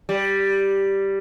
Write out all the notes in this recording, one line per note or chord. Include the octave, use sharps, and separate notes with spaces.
G3